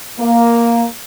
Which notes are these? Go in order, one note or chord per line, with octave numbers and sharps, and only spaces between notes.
A#3